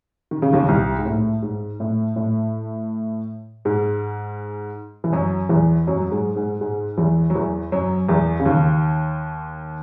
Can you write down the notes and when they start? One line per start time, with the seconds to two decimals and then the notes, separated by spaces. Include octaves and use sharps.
0.31 D#3
0.42 C#3
0.53 D#2 D#3
0.68 C2 C3
0.99 G#2
1.06 A2
1.42 G#2
1.80 A2
2.16 A2
3.65 G#2 G#3
5.04 E3
5.12 F#2 F#3
5.49 E2 E3
5.87 F#2 F#3
6.00 F#3
6.11 G#2 G#3
6.36 G#2 G#3
6.61 G#2 G#3
6.97 E2 E3
7.30 F#3
7.35 E2 E3
7.72 F#2 F#3
8.09 E2 E3
8.40 C#3
8.46 D#2 D#3